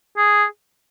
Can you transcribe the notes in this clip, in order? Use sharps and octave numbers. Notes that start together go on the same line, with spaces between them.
G#4